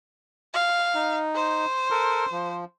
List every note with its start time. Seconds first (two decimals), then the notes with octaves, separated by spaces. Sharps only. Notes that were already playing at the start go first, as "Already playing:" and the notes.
0.54 F5
0.95 D#4
1.35 C5
1.91 A4 A#4
2.32 F3